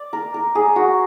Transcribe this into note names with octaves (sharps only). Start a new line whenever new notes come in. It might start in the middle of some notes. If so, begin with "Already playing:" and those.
Already playing: D5
A#4
A#4
G#4
F#4